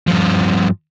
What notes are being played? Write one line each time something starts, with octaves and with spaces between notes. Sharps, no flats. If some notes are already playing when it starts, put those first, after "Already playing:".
G2 F3